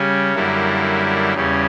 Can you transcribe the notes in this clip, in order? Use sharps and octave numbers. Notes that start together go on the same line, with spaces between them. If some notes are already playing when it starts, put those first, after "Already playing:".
Already playing: C#3 G3 C#4
F#2 D3 G3 A#3 E4
E2 C#3 G3 C#4